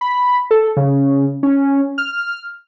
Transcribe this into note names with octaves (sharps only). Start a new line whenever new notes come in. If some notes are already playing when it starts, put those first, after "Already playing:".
B5
A4
C#3
C#4
F6